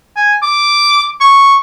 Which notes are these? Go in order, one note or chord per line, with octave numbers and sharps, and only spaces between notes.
G#5
D6
C#6